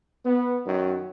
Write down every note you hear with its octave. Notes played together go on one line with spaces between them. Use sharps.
B3
F#2 D#3